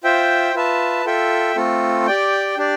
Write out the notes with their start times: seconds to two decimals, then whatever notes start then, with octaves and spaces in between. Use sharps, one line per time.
0.04 F4 C5 E5 G5
0.54 F4 B4 E5 A5
1.05 F4 A4 E5 G5
1.56 A3 C4 F4 A4
2.07 G4 D5 G5
2.58 D4 G4 D5